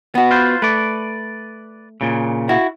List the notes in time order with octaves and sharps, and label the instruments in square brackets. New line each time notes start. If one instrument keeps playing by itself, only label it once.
[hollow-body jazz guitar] B3 F#4
[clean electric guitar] F4 B4 C5
[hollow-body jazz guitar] A3 [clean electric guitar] B4 D5
[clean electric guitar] A#2 C#3
[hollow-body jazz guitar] E4 F#4